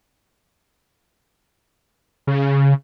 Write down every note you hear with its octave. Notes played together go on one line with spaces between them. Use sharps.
C#3